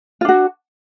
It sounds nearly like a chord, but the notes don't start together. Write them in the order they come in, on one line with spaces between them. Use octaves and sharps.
F4 D4 F#4